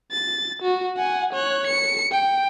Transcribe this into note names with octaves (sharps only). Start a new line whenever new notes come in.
A6
F#4
F#5 G#5
C#5 F#6
C#7
G5